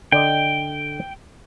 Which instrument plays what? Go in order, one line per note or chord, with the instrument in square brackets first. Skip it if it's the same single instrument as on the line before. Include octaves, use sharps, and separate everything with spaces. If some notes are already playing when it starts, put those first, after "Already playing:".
[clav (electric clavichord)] D3 D5 D#5 [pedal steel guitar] G5